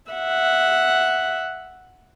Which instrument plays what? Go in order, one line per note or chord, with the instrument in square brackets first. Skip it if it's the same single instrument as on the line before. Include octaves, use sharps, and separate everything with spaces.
[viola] E5 F#5